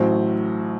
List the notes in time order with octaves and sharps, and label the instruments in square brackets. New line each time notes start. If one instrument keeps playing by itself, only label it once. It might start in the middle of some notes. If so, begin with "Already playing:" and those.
Already playing: [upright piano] A1 A2 F#3 C5